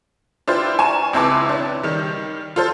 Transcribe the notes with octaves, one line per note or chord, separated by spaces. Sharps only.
D4 E4 F4 G4 B4 C5
G#5 A#5 C#6 E7
C#2 C4 E4 B4 A5 D6
C#4 D4
D#3 G3
F4 A4 C5